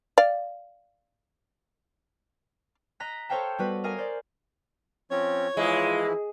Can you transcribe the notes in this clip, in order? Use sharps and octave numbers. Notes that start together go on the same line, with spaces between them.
D5 F5
D#5 A#5 F#6 A#6 B6
A4 C5 C#5 F5 G5 A5
G3 B3 F#4 B4
A#4 D#5 F5 G#5
C5 D5
F3 C4 C#4 C#5
E3 F3 G#3 E4 F4